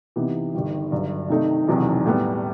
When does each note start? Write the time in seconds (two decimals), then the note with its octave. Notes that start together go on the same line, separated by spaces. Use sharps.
0.16 C3 E3 B3 D#4 G4
0.54 G1 G2 D#3 G3
0.92 G1 G2 F#3
1.29 C3 D#3 A3 D#4
1.67 E1 E2 C3 D#3 F#3
2.05 A2 G3 B3